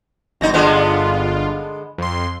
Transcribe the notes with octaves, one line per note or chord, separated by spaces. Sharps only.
G1 F#2 D#4 A#6
G1 D3 G#3 B3 F4
F2 C6